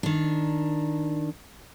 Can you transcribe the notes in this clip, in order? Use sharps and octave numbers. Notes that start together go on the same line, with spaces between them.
D#3 D4